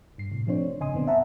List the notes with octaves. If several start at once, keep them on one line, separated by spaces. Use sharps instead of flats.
G2 C7
A2 C3
F3 A3 C4 D4 C5 C#5
G#1 C#3 D#5 G#5 C6 D#6
F#2 B2 D3 B3 C4 D4
E5 F#5 A5 A#5